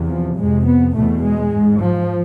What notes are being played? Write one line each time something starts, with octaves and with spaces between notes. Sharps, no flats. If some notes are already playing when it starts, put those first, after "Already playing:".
Already playing: E2 C3
F3
F2 C3 G#3
B3
E2 B2 A3
G#3
G#2
F3